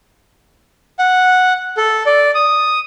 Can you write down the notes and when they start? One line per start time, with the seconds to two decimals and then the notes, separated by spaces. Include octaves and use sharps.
0.99 F#5
1.77 A4
2.06 D5
2.35 D#6